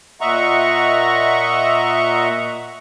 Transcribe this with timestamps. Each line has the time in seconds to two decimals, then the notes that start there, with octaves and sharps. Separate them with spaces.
0.21 A#2 D#5 E5 F#5 A#5 C#6